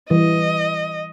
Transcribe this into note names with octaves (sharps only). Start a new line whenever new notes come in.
E3 G3 D#5